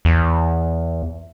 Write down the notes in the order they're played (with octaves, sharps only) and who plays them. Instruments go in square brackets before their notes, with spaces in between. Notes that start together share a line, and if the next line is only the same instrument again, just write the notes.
[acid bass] E2